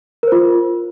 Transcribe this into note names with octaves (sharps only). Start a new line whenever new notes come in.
F4 A#4 C5